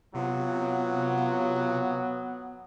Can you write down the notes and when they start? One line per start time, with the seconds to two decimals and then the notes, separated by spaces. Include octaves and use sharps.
0.15 C3 F#3 B3 F4